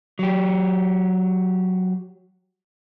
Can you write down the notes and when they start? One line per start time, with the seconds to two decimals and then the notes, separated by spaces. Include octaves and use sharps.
0.19 F#3 G4